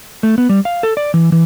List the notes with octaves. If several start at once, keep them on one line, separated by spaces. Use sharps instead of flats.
A3
B3
G3
F5
A4
D5
E3
E3